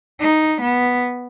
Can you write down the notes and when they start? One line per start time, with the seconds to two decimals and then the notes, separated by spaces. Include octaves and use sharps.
0.20 D#4
0.61 B3